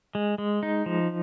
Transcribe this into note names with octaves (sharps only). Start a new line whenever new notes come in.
G#3
G#3
D#4
F3